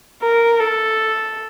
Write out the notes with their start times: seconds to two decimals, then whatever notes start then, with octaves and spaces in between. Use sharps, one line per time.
0.23 A#4
0.60 A4